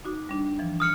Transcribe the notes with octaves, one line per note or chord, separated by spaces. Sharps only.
D#4 F#4 D6
G3 D4
E3 F3
D#6 F6 C#7